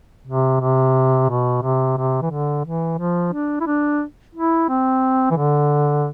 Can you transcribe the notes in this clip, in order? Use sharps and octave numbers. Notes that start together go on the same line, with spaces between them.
C3
C3
B2
C3
C3
E3
D3
E3
F3
D4
E4
D4
E4
C4
E3
D3